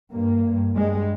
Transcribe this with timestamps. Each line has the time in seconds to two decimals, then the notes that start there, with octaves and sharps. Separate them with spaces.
0.11 G2 A#3
0.43 G2
0.75 G2 G#3